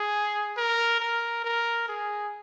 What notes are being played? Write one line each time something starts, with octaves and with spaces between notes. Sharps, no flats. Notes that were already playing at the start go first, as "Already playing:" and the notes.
Already playing: G#4
A#4
A#4
A#4
G#4